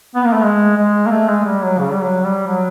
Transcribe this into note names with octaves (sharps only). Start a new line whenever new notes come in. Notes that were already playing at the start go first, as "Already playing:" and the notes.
B3
A#3
A3
G#3
G#3
A#3
A3
G#3
G3
F#3
C#3
G3
F#3
G3
F#3